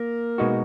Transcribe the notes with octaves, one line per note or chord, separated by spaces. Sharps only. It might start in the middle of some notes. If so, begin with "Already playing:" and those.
Already playing: A#3 A#4
B2 G#3 D#4 F#4